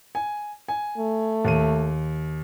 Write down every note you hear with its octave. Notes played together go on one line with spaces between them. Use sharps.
G#5
G#5
A3
D#2 D#7